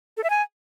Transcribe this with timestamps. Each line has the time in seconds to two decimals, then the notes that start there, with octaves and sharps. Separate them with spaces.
0.17 A4
0.24 E5
0.30 G#5